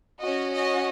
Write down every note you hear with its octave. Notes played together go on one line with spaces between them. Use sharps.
C#4 F#4 D#5
D#5